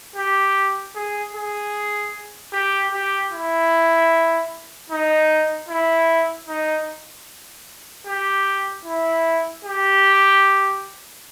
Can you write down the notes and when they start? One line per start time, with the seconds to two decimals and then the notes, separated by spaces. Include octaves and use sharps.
0.16 G4
0.95 G#4
1.35 G#4
2.53 G4
2.92 G4
3.32 E4
4.90 D#4
5.68 E4
6.48 D#4
8.07 G4
8.86 E4
9.65 G4